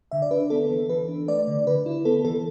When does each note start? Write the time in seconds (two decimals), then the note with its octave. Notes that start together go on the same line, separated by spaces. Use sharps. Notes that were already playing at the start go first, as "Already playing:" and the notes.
0.11 D3 E5
0.22 D5
0.31 D4 B4
0.50 B3 A4
0.70 E3
0.89 E3 B4
1.08 D4
1.28 A3 D5
1.48 D3
1.67 D3 B4
1.86 E4
2.05 B3 A4
2.25 E3 A4